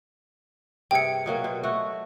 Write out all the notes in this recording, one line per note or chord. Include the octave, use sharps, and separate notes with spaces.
G2 C3 G#4 G5 C#7
B2 F#3 A#3
B2 C5
A3 F#4